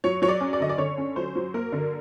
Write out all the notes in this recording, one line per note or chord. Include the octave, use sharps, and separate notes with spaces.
F#3 C#5
F#3 C#5
D5
C#4
D5
D3 D#5
D5
D3 C#5
C#4
F#3 C5
F#3
A#3 A#4
D3